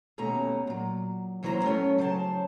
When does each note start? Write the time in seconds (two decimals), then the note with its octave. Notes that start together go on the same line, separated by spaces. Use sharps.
0.18 D#2 B2 A3 C#4 A#5
0.67 A#2 F#3
1.43 D#2 E3 F#3 C5 C#5 A#5
1.63 F#3 A3 C#4 C#5
1.98 C#3 F#3 C5 A5